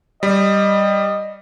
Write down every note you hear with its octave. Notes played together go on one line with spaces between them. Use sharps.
G3 D#5